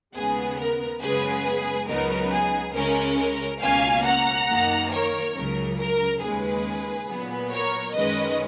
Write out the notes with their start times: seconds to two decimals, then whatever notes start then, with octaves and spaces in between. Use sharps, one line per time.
0.15 D#2 C#3 G#3 B3 G#4
0.59 A#4
1.02 F#2 C#3 G#3 B3 G#4 B4
1.89 C#2 C#3 F#3 B3 D#4 A#4
2.32 G#4
2.75 C#2 C#3 G#3 C#4 A#4
3.18 A#4
3.62 C#2 B2 A#3 C#4 F5 G#5
4.05 F#5 A#5
4.48 F#2 D#3 A#3
4.91 A#4 C#5
5.35 C#2 C#3 F#3 A#4
5.78 A#4
6.21 D#2 C#3 G#3 G#4 B4
7.08 A#2 F#3 B3
7.52 A#4 C#5
7.95 F#2 D#3 G#3 C#4 B4 D#5